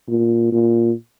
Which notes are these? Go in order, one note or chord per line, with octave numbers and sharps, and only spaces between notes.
A#2
A#2